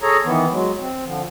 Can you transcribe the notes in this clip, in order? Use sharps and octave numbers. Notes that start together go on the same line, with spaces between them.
G#4 A4 C#5 A#5
D#3 E3 B3
F#3 G#3
C4
D3 F3